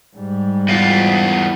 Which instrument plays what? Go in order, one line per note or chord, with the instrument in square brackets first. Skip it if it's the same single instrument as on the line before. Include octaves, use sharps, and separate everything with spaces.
[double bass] G#2 G3
[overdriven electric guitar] E2 F4